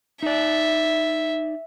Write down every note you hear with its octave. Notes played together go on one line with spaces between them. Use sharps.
D#4 D5 E5